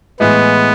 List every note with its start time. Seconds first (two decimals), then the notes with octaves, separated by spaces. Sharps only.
0.20 A2 E3 G#3 B3